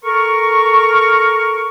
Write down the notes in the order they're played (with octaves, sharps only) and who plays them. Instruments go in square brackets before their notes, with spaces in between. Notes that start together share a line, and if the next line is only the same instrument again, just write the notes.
[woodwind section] A4 A#4 C#6